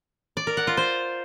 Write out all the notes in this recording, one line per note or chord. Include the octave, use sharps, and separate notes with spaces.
D5
A#4
F#5
F4
C5